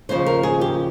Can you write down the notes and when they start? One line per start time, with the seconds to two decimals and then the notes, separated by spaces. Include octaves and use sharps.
0.09 D#2 C#3 F3 C5
0.26 A#4
0.43 G#4
0.61 G4